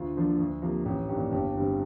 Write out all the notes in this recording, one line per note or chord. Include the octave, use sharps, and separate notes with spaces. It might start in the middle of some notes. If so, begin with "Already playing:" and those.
Already playing: D2 F4
D3 F3 A#3 D4
D2
C3 F3 A#3
A1 G4
G2 D#3 A#3 D4 G4
G1 G4
G2 D3 G3 C4